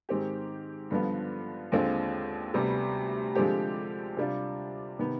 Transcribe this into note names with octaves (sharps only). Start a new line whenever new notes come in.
G#2 D#3 G#3 C4 G4
G2 D3 F3 B3
D#2 D3 G#3 C4 F4
D2 C3 G3 B3
D3 F3 G#3 C4 G4
C3 G3 D4 F4
C3 D#3 B3